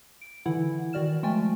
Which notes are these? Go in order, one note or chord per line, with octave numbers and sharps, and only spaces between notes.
D7
D3 E3 E4 F#5
D#3 F#4 D5 F6 E7
F3 G#3 A3 G5 G#5 A6